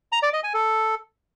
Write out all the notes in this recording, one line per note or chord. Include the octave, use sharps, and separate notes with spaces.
A#5
D5
D#5
G#5
A4